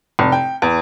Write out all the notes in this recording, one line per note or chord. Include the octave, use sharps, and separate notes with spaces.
F1
G5
E2